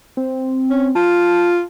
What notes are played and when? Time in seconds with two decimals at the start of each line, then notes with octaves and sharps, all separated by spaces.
0.17 C4
0.70 C#4
0.95 F4 A5